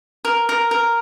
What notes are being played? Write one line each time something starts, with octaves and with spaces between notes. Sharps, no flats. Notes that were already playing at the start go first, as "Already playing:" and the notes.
A#4
A#4
A#4